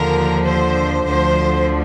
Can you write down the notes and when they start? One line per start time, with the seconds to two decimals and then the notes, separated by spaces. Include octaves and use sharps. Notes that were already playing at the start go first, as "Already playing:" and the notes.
Already playing: D#2 D3 F3 A#4
0.44 C5
1.06 D2 D3 F3 C5